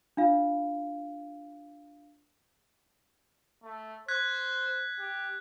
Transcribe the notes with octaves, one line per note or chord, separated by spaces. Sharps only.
D4 F4 F5
A3
C5 F#6 G#6 B6
G4